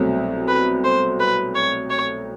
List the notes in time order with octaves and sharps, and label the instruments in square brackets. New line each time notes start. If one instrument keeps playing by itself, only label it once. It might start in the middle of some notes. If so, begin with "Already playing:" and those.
Already playing: [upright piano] C2 B2 F#3 A3 C4
[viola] B4
C5
B4
C#5
C#5